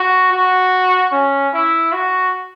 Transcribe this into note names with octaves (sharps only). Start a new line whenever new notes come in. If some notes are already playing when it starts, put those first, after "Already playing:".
Already playing: F#4
F#4
C#4
E4
F#4